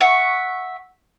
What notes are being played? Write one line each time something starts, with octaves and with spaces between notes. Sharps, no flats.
E5 F#5 C#6